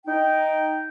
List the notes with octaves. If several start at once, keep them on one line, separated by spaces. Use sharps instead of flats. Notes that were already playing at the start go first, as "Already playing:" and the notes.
D#4 G5